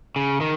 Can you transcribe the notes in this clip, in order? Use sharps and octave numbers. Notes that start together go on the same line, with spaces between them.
C#3
D#3